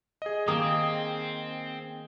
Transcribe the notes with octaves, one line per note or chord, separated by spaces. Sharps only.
G#4 D#5
D#3 A#3 C4 D#6